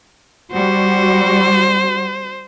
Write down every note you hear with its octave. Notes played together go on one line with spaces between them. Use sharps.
G3 F#4 C5